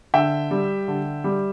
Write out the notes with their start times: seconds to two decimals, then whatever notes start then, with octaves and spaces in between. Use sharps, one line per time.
0.14 D3 E5 G5
0.51 G3
0.88 D3
1.24 G3